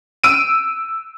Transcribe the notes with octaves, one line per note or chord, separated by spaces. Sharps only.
E6 D7 D#7